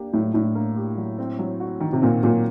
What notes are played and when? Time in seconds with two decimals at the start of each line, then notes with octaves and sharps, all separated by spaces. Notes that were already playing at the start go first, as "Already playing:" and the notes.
Already playing: A#3 D4 G4
0.13 A2 F#3
0.33 A2 D4
0.55 A#3
0.76 G4
0.98 F#3
1.19 C4
1.39 F#3
1.60 F#4
1.80 D#3
1.93 C3
2.02 A#2 C4
2.23 A#2 F#3